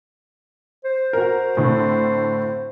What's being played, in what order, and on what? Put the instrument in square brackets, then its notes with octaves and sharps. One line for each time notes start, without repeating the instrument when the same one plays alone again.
[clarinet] C5
[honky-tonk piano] F#4 A#4
A2 D3 C4